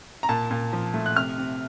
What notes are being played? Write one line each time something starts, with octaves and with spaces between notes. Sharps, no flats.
A#5
A#2 A5
A#2
F3
A3
F#6
C3 F6
C3